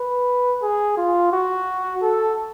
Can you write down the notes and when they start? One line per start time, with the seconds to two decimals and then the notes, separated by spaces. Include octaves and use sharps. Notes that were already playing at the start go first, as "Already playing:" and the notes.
Already playing: B4
0.62 G#4
0.97 F4
1.32 F#4
2.02 A4